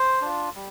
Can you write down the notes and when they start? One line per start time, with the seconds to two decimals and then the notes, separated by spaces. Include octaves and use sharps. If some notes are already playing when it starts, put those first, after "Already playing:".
Already playing: C5
0.21 D4 F4
0.55 G3